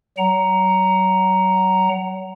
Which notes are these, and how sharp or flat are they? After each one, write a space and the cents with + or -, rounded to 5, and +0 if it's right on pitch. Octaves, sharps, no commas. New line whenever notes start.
F#3 +30 F#5 +25 A#5 +0